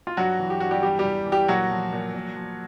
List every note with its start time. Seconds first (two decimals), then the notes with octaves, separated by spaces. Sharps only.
0.07 F4
0.17 G2 F#3 F#4
0.39 E3
0.50 G4
0.60 G2 F#4
0.71 G3 G4
0.83 E2 G3 G4
0.99 G3 G4
1.05 E2
1.27 E3
1.32 G3 G4
1.48 A#2 F#3 F#4
1.71 F3
1.93 A#2
2.14 A#2
2.36 F3